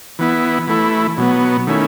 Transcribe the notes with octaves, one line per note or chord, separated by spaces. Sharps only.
E3 B3 E4
E3 A3 E4
B2 F#3 B3
D#3 A3 C#4 E4